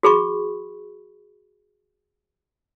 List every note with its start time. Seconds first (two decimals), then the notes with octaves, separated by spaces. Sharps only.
0.03 F#4 G#4 B5 C#6